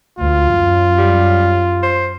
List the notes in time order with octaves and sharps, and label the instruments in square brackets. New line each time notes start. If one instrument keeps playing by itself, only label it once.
[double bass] D2 [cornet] F4
[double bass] F#2
[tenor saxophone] G3
C5